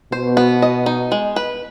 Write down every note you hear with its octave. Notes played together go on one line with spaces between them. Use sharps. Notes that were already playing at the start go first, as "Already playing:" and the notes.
B2 C5
B3
D#5
D#4
G#3
B4